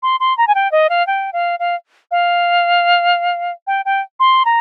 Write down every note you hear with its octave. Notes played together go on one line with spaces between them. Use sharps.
C6
C6
A#5
G#5
G5
D#5
F5
G5
F5
F5
F5
G5
G5
C6
A#5